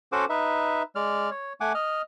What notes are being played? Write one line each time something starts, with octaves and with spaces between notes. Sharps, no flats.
C#4 F#4 A4 C5 F#5 D6
D#4 B4 E5
G#3 D5 F6
C#5
A3 F#5 G#5 D6
D#5 F6